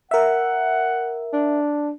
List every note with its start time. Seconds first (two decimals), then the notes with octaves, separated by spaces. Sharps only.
0.11 A#4 E5 F#5
1.33 D4